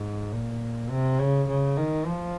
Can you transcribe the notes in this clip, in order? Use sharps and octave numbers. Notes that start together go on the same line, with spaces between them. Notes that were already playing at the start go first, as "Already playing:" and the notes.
Already playing: G#2
A#2
C3
C#3
C#3
D#3
F3